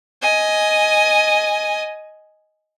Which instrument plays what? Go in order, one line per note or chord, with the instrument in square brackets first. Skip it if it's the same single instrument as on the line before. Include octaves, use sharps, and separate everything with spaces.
[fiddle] D#5 G#5